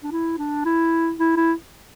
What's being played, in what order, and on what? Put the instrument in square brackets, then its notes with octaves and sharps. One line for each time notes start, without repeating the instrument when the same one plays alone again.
[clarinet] D4
E4
D4
E4
E4
E4